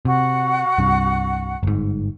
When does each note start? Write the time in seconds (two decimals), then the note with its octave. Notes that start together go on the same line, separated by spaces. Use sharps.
0.05 C3 F#4 F#5
0.78 C2 G2
1.63 G1 G#2